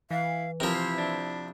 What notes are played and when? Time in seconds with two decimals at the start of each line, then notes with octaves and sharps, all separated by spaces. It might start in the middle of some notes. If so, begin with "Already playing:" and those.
0.11 E3 E4 F5
0.60 C3 F3 E4 A#4
0.74 C5
0.98 D4